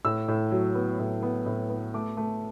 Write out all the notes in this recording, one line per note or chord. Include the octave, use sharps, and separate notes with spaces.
A2 E6
A2
F#3
B3
A2
B3
A2
B3
A3 D6
A3